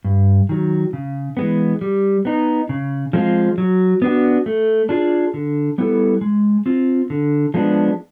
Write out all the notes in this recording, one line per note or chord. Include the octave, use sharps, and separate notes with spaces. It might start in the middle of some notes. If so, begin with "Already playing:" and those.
G2
D#3 F#3
C#3
E3 G#3 B3
G3
B3 D#4
C#3
F3 G#3 C4 F4
F#3
B3 D4 F#4
A3
D4 F4 G#4
D3
G3 B3 E4 A4
G#3
C4 F4
D3
F3 G#3 B3 D4